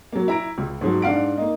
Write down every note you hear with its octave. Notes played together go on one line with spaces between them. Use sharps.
F#3 A#3
E4 A#5 D7
C#2
G#2 F3 F#3
G#2 D4 F5 F#5 D7
A#3 D#4